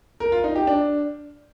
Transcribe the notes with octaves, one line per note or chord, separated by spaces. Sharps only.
A#4
F4
D#4
G4
D4